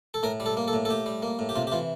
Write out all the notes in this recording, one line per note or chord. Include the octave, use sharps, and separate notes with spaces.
A4
A2 A#4
G3
A4
A#3
A4
A2
A4
A2 G4
G3
A#3
A2
G4
C3 F4
G4
E3 F4